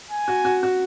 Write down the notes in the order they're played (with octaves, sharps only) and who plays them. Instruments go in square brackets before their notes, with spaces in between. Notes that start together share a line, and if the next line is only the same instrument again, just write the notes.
[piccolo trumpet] G#5
[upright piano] F#4
F#4
F#4